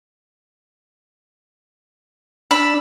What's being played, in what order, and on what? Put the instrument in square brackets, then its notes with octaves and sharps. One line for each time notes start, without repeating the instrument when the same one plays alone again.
[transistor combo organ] D4 E6 [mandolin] B5